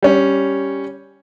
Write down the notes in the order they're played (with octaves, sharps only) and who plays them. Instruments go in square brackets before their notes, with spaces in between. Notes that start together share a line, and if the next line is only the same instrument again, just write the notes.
[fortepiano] G3 C#4